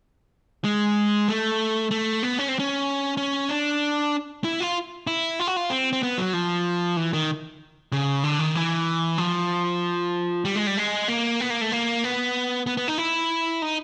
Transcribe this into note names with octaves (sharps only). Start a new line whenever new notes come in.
G#3
A3
A3
B3
C#4
C4
C#4
C#4
D4
E4
F4
E4
F4
F#4
F4
C4
C4
B3
F#3
F3
E3
D#3
C#3
D3
D#3
E3
F3
G3
G#3
G3
G#3
A#3
B3
A#3
A3
A#3
B3
B3
B3
D#4
E4
D#4